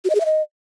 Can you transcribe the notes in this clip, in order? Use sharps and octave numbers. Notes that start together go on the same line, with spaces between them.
F#4
D#5
G#4
E5
D#5